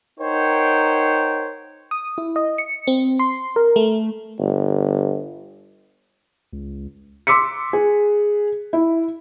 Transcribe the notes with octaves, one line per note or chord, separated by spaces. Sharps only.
D#4 A#4 C5 C#5 F#5 G5
D#6
E4
D#5
C#7
C4
C6
A#4
A3
G1
C#2
C6 D6 E6 B6 C#7
G#4
E4